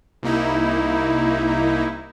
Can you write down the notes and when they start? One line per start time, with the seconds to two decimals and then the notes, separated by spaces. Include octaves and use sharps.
0.23 C2 A#3 D#4 E4